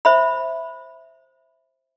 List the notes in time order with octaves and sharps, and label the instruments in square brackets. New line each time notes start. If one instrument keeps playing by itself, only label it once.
[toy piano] C5 E5 B5